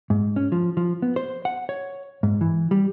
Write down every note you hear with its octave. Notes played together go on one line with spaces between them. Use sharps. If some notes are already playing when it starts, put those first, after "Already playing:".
G#2
C#4
F3
F3
B3
C5
F#5
C#5
G#2
E3
G3